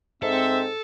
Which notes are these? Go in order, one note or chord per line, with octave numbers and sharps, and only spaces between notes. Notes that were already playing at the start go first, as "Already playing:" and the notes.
G#2 C4 A4 E5